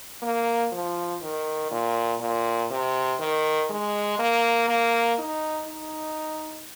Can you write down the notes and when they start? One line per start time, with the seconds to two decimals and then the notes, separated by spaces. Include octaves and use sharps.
0.22 A#3
0.72 F3
1.22 D#3
1.71 A#2
2.21 A#2
2.70 C3
3.20 D#3
3.70 G#3
4.19 A#3
4.69 A#3
5.19 D#4
5.68 D#4